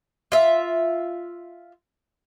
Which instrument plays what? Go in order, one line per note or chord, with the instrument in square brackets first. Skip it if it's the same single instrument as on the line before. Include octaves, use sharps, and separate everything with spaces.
[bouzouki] F4 E5